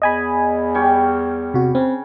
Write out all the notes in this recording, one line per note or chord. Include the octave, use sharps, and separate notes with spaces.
E2 D#5 G#5 B5
G3 C#5 G5
C3 F#4
C#3 C4